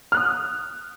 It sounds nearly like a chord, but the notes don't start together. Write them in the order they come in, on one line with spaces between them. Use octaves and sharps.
F6 F#6 D#6